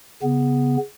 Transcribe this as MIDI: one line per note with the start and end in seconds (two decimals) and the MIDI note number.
0.23 0.77 49
0.23 0.77 59